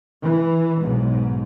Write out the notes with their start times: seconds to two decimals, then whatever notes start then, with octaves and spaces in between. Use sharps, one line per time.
0.22 E3
0.80 B1 G#2